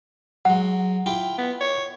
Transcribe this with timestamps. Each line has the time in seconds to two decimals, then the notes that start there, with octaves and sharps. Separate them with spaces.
0.45 F#3 G#3 F#5
1.06 E4 F4 G5
1.38 B3
1.61 C#5